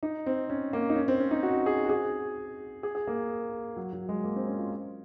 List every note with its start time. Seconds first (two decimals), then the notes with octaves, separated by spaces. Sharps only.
0.03 D#4
0.26 C4
0.50 C#4
0.73 A#3
0.90 D#4
0.96 C#4
1.08 C4
1.20 C#4
1.31 D#4
1.43 F#4
1.66 G#4
1.84 F#4
1.89 G#4
2.83 G#4
2.95 G#4
3.07 A#3
3.76 F#3
3.93 F#3
4.09 G#3
4.24 A#3
4.36 C4
4.47 C#4
4.59 F4